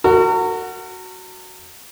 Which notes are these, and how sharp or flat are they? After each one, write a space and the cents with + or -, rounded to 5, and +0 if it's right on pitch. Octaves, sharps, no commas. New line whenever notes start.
F#4 +0 A#4 -40